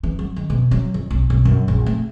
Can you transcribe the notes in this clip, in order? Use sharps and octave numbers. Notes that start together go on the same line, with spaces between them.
E3
F#3
D#3
B2
F#3
F2
B1
B1
F#2
A#1
A3